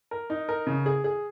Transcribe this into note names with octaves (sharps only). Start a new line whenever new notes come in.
A#4
D#4
A#4
C#3
G#4
G#4